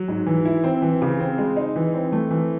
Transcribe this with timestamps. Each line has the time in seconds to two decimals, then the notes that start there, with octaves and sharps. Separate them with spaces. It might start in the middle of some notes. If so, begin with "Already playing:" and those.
Already playing: F#3
0.08 G#2
0.26 E3
0.45 E4
0.64 C4
0.82 E3
1.02 C#3
1.20 C4
1.38 G#3
1.56 D#4
1.76 E3
1.94 C4
2.12 A3
2.31 E3